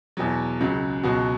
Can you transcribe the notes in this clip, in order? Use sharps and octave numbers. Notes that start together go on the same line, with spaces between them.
E2 B2 F#3
C#2 C#3 F#3
C#2 B2 F#3 F#4